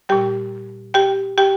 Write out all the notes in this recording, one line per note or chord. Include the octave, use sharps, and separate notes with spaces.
A#2 G3 G4 G5
G4 G5
G4 G5